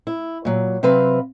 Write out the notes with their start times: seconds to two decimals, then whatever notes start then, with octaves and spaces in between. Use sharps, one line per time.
0.07 E4
0.45 A#2 F#3
0.83 C3 F#3 C4 B4 F5